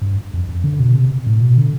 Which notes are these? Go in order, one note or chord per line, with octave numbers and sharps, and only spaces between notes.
G2
F2
F2
D3
B2
C3
A2
B2
D3